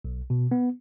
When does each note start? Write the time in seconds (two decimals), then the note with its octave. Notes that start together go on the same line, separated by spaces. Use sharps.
0.05 B1
0.30 B2
0.51 B3